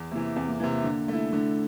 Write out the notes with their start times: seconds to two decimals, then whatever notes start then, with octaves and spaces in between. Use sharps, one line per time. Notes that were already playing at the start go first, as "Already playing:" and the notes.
Already playing: E2
0.11 C3 E3 A#3
0.36 E2 C4
0.48 A#3
0.60 C3 E3 A#3
0.73 A#3
0.84 D3 A#3
1.08 A3 E4
1.33 D3 A3